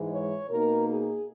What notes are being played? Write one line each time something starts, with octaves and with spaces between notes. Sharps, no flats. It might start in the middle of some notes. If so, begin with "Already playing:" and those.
Already playing: G#2 E3 G#3
C#5
B2 A#3 D#4 A#4
G#4